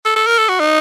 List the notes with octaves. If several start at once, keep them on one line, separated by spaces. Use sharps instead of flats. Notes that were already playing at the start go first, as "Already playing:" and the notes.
A4
A4
A#4
A4
F#4
D#4